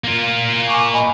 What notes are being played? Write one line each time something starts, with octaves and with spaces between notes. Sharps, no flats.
A#3 F4
G#5 C#6 D6
D#5 G#5 B5